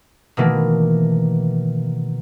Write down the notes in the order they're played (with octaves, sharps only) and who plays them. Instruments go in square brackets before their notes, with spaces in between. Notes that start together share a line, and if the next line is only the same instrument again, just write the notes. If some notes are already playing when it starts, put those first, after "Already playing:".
[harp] B2 D#3 E3 A3 A#3